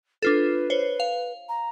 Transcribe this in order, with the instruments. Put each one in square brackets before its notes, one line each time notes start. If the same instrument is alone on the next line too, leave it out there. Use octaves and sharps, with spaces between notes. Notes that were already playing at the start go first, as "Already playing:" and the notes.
[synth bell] D4 F4 A4 [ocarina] B4
[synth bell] C5 C#5
F5
[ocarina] A#5